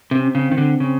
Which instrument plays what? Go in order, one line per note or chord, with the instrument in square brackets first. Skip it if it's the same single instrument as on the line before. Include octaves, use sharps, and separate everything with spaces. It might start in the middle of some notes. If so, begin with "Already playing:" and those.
[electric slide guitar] C3 [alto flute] C4
[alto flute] C#4
C4
[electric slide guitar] C#3
D#3
D3
C#3